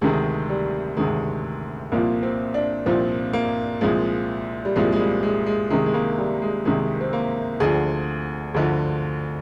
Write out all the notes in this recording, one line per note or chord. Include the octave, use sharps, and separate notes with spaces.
D2 C3 D#3 G#3
G3
D2 C3 D#3 G#3
C2 A#2 F3 A#3
C4
D4
C2 A#2 F3 C4
A#3
C2 A#2 F3 G#3
G3
C2 A#2 F3 G#3
G#3
G3
G#3
G#3
C2 C3 D#3 G#3
G#3
A#3
G3
G#3
C2 C3 D#3 G#3
C4
A#3
D2 D3 F3 G#4
D2 D3 F3